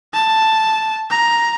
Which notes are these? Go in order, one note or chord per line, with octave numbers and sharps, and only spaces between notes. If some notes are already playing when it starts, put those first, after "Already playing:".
A5
A#5